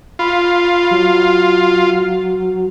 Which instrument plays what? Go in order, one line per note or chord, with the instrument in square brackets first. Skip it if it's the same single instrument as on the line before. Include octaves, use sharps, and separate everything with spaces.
[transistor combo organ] F4 [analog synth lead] B5
[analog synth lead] F#3